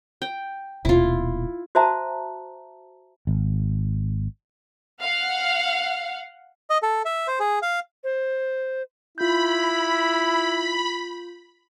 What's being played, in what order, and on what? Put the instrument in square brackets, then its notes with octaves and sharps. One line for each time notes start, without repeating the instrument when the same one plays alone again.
[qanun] G5
[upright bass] D#1 B2 [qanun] E4 F4
[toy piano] F#4 C5 E5 A5 A#5
[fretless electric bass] G#1
[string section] F5 F#5
[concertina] D#5
A4
E5
C5
G#4
F5
[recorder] C5
[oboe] E4 [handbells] F4 G6 [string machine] B5